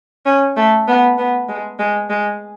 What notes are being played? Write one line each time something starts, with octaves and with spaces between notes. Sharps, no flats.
C#4
A3
B3
B3
G#3
G#3
G#3